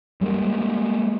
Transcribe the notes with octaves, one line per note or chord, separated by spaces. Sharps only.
G3 G#3 A#3